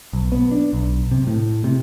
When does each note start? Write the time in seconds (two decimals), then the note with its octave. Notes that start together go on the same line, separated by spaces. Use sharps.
0.13 B1
0.32 B3
0.52 D4
0.73 B1
1.11 C3
1.27 A2
1.64 C3